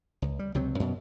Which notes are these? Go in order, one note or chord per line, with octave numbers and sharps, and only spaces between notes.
C#2
G3
C#2 C3 F#3 C4
F#2 B2